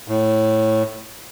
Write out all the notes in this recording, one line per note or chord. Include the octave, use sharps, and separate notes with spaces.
A2